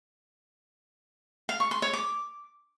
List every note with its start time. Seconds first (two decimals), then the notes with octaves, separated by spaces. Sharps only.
1.49 F5
1.60 C#6
1.71 C6
1.82 C#5
1.93 D6